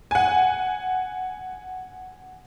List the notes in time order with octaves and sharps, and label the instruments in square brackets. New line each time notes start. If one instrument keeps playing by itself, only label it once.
[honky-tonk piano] F#5 G#5